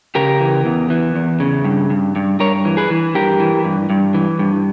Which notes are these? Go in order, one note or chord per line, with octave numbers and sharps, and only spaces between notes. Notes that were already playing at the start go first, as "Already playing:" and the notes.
C#3 G4 A#4
E3
E2
E3
E2
C#3
G2
G2
G2
G2 A#4 C#5
E3
G#4 B4
E3
G2 G4 A#4
E3
G2
G2
E3
G2